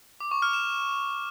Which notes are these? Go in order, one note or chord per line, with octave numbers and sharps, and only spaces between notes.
D6
C#6
F6
E7